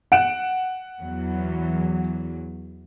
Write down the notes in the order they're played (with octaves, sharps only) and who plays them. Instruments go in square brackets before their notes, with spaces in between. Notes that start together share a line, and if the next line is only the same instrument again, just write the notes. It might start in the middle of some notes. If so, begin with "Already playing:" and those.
[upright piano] F#5 D7 E7
[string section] E2 F#3